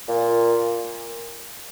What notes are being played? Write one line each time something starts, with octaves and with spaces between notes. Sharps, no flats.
A#2